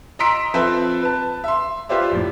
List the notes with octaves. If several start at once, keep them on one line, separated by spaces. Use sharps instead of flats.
D#5 A#5 C6 E6 B6 D7
F3 C4 A4 B4 C5 E5
B4 A5
E5 C6
F4 G4 B4 C5 D5 E5
A#1 A2